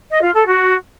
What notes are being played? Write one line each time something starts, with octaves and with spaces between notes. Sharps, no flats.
D#5
F4
A4
F#4